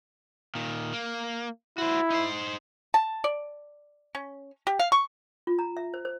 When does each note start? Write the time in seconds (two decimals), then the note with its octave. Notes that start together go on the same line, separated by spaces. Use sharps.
0.55 A#2 D#3
0.93 A#3
1.78 E4 F#4 C5
2.10 D#4 C5
2.94 A5
3.24 D5
4.15 C#4
4.67 G4
4.79 F5
4.92 C#6
5.47 F4
5.59 A#5
5.77 E5
5.94 C5
6.05 C5